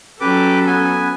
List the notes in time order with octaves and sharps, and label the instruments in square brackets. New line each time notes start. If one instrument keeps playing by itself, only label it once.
[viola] F#3 A4 [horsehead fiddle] C#4 [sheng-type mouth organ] G4 B4 D6
[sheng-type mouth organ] B3 G#5